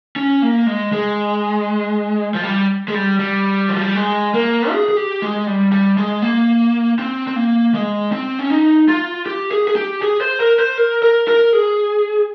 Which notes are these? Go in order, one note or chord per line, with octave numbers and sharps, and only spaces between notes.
C#4
A#3
G#3
G#3
F3
G3
G#3
G3
G3
F3
G3
G#3
A#3
G#4
G#4
G4
G#3
G3
G3
G#3
A#3
C4
C4
A#3
G#3
C4
C#4
D#4
F4
G4
G#4
G#4
G4
G#4
C5
A#4
C5
A#4
A#4
A#4
G#4